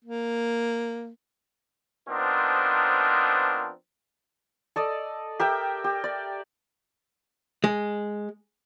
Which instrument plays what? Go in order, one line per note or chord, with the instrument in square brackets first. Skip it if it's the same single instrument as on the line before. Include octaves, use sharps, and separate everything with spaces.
[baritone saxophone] A#3
[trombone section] F3 B3 C4 D4 D#4 A#4
[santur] A4 D5 D#5
G4 A#4 E5 G5
G4
D5
[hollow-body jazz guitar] G#3